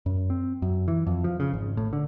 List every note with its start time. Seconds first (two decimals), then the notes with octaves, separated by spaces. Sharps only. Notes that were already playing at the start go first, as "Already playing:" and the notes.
0.06 F#2
0.30 C4
0.62 F#2
0.88 E3
1.07 F2
1.24 F3
1.40 C#3
1.53 G#1
1.77 A2
1.93 D3